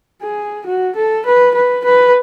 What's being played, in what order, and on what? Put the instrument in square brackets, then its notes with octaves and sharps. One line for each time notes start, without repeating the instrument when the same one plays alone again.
[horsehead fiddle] G#4
F#4
A4
B4
B4
B4